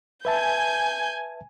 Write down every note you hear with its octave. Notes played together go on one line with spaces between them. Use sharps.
B4 E5 G#5 A5 G6